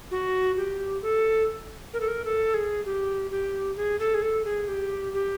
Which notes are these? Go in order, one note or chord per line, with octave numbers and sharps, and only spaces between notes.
F#4
G4
A4
A#4
A4
A#4
A4
G#4
G4
G4
G#4
A4
G#4
A4
G#4
G4
G4